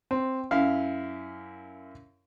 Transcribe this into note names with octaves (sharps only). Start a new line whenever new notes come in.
C4
F#2 E4 F5